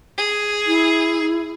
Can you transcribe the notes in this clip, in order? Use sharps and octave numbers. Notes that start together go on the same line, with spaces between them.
G#4
E4